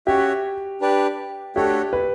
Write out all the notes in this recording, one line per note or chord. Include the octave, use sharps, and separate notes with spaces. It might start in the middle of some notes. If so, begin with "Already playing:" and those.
C#4 F#4 G4 C#5 E5
D4 G4 B4 D5
A3 D4 F#4 G4 A4 C#5
B4